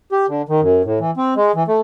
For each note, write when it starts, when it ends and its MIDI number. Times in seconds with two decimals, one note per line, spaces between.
0.12 0.26 67
0.29 0.42 50
0.49 0.61 51
0.61 0.82 42
0.85 0.99 45
1.00 1.11 52
1.17 1.34 60
1.36 1.52 56
1.55 1.63 52
1.68 1.81 57